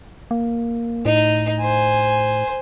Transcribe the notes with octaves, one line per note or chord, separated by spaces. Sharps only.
A#3
A2 D#4
C5 G#5